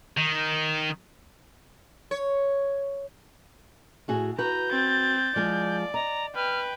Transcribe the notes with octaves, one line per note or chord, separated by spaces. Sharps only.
D#3
C#5
A2 F#4 G#4
F#4 B4 A#5 G6
C4 A6
F3 G#3 G#4 D5
D#5 A#5
B4 G5 F6